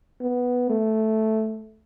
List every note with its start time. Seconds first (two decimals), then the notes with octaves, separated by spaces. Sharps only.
0.21 B3
0.70 A3